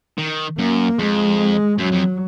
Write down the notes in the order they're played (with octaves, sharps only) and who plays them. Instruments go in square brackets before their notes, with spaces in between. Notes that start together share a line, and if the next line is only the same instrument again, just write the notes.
[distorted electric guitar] D#3
[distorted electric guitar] F#2 [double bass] A#3
[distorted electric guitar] F2 [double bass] G#3
[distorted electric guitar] F#2 [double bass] F#3
[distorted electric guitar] F2